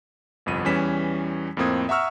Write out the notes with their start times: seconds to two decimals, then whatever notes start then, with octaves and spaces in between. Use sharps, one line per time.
0.46 G1 C2 F2 D#7
0.64 E2 E3 G3 C#4 B6 E7
1.57 F2 A2 A#3 C4 D#6 G#6
1.89 E5 F#5 A#5 C#6 E6 F6